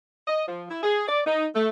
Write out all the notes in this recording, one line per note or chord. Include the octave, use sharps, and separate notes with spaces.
D#5
F3
E4
G#4
D5
D#4
A3